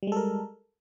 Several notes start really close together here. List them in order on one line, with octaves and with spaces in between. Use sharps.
G3 G#3 A4 A#4